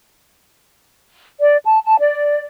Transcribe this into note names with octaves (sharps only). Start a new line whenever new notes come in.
D5
A5
A5
D5